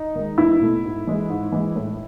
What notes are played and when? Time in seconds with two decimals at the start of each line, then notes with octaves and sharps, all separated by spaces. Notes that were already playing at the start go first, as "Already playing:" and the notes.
Already playing: D#4
0.15 D#3 G#3
0.38 E2 E4
0.60 B2 A3
0.85 G#2
1.07 E3 G#3
1.30 G#2
1.52 E3 G#3
1.76 A2